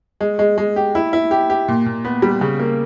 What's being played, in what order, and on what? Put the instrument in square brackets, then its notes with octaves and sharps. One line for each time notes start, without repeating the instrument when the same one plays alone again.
[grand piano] G#3
G#3
G#3
G4
E4
E4
G4
G4
A#2
A#2
B3
G3
C#3
A#3